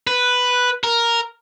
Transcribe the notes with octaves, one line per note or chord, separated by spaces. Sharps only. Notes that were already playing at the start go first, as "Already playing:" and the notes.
B4
A#4